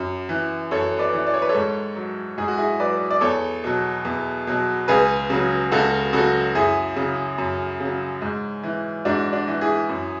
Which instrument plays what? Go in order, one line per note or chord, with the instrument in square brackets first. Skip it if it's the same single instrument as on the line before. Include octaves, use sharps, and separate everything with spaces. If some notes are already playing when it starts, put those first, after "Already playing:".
Already playing: [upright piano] F#2
E3
F#2 A4 C#5
B4 D5
E3
D5
C#5
B4
A4 C#5
G#2
F#3
G#2 G#4
F#4
E4 G#4
F#3 B4 D5
D5
E2 A4 C#5
B2 F#3
E2
B2 F#3
C#2 G#4 B4
C#3 F#3
C#2 F#4 A4
C#3 F#3 F#4 A4
F#2 E4 G#4
C#3 F#3
F#2
C#3
F#3
G#2
E3
G#2 D4 F#4
D4 F#4
E3
E4 G#4
F#2